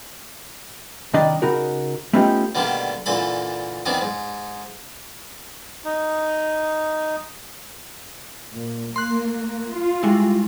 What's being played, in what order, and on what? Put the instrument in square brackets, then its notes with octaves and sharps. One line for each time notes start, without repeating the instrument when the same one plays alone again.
[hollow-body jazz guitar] C2 D#3 D4 D5 D#5
C#3 D#4 F#4 A#4
A3 B3 C#4 D#4 F4 G4
[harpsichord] B2 D3 D#3 G3 A3 A#3
A#2 D3 E3 A4 B5
D#3 E3 B3 C4 D4
G#2
[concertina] D#4
[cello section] A#2
[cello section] A#3 [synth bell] C6 F#6
[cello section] F4
[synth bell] G3 G#3 E4